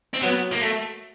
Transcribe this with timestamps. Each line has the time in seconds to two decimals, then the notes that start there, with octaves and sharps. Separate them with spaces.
0.14 C4
0.22 F#3 B3
0.53 A#3
0.61 A3